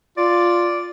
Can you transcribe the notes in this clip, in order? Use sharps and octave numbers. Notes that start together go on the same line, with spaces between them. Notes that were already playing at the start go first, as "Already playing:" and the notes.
F4 D5